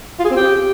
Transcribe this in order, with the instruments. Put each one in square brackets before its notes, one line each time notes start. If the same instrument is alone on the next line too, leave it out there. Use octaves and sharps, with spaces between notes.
[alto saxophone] F4
G#4
C4
G4